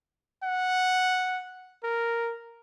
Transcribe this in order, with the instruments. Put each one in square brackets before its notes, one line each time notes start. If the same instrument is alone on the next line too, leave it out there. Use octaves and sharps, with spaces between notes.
[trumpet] F#5
A#4